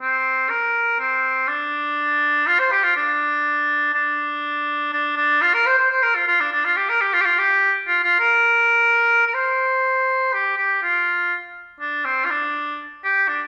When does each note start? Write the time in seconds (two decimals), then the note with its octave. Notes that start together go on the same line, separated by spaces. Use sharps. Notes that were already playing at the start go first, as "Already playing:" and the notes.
0.02 C4
0.50 A#4
0.99 C4
1.48 D4
2.47 F4
2.59 C5
2.72 G4
2.84 F4
2.96 D4
3.94 D4
4.93 D4
5.17 D4
5.42 F4
5.54 A#4
5.66 C5
5.78 C5
5.91 C5
6.02 A#4
6.15 F4
6.27 F4
6.40 D4
6.52 D4
6.65 F4
6.77 G4
6.89 A#4
7.01 G4
7.13 F4
7.21 G4
7.25 F4
7.39 G4
7.88 F4
8.04 F4
8.20 A#4
9.27 A#4
9.34 C5
10.34 G4
10.57 G4
10.83 F4
11.80 D4
12.05 C4
12.25 F4
12.30 D4
13.04 G4
13.28 D4